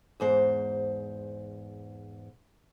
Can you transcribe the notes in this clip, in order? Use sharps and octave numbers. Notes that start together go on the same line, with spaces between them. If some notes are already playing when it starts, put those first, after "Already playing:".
E2 G#2 C5